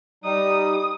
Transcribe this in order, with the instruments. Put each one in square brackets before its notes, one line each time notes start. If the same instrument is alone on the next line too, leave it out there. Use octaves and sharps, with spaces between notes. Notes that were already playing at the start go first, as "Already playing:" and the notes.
[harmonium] G3 D#4 [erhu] D#6